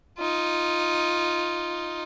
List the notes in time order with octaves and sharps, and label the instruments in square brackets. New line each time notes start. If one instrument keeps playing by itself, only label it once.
[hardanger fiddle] D#4 F4